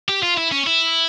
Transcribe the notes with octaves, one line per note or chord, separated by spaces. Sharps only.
G4
F4
E4
C#4
E4